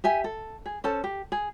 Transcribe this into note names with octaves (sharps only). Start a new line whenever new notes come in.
G4 E5 G#5
A4
G#4
C#4 A4 C5 A5
G4
G#4